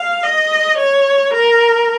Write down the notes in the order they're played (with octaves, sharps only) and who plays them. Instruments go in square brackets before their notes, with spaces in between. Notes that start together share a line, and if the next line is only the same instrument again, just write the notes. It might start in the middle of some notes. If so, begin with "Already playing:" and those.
Already playing: [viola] F5
D#5
C#5
A#4